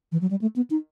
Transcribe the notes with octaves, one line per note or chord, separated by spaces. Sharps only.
E3
F#3
G3
A3
B3
D#4